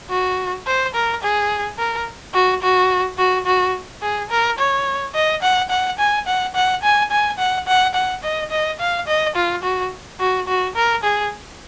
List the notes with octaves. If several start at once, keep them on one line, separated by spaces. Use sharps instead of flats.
F#4
C5
A#4
G#4
A#4
F#4
F#4
F#4
F#4
G#4
A#4
C#5
D#5
F#5
F#5
G#5
F#5
F#5
G#5
G#5
F#5
F#5
F#5
D#5
D#5
F5
D#5
F4
F#4
F#4
F#4
A#4
G#4